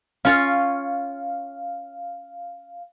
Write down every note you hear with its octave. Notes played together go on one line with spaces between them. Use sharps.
C#4 F4 C#5 F5